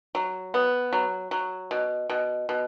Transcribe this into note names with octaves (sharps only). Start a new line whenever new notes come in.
F#3
B3
F#3
F#3
B2
B2
B2